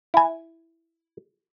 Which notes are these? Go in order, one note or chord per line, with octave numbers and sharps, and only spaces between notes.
E4 G#5